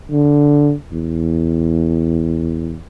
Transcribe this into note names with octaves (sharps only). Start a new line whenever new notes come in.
D3
E2